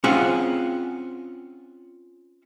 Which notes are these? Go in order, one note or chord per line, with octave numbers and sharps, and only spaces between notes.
C4 C#4 F4 G#4 F5 F#5